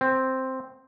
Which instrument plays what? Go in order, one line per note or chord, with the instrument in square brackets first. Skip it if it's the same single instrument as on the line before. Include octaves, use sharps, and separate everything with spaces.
[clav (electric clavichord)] C4